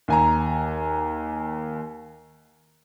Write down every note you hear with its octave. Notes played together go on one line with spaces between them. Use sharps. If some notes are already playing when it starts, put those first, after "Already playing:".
D#2 G#5 A#5